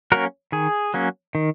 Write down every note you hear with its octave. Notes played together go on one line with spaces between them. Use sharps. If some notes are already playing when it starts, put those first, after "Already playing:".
F#3 A#3 C#4 F#4 A#4
D#3 G#4
F#3 A#3 C#4
D#3